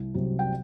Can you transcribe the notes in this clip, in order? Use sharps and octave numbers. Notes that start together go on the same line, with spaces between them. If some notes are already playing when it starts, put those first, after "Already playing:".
Already playing: C2
C3 F#3
G5